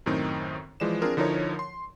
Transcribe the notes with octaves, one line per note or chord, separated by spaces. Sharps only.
F#2 A2 D#3 C4 D#4
E3 F3 G#3 D5 E7
C4 D4 F4 G#4 A#4
D3 F3 D#4 E4 A#4 C#5
C6